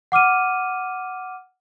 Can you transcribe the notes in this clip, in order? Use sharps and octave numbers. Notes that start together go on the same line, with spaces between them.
F#5 D6 F6 D#7